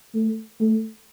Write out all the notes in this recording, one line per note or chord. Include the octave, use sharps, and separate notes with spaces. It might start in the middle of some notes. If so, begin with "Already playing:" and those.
A3
A3